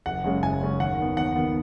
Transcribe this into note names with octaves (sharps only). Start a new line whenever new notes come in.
F#1 F#5
F#2 C#3 G#3 C#4
F#1 G#5
F#2 C#3 G#3 C#4
D#2 F#5
D#3 B3
D#2 F#5
D#3 B3